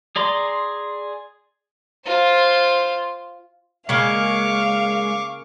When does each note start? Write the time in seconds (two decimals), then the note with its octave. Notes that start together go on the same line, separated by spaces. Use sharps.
0.16 G#4 D5 A#5 C6
2.06 F4 C5
3.89 C#3 G#3 A#3 F5 C#6 D6